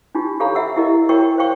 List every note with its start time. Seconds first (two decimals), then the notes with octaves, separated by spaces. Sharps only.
0.15 D4 D#4 F4 G4
0.40 G4 A4 C#5 F5 A#5 B5
0.55 E5 F#5 E6
0.76 E4 G4 A#4 D#5
1.09 F#4 A#4 C#5 G5 C#6
1.38 C5 C#5 F5 G5 C#6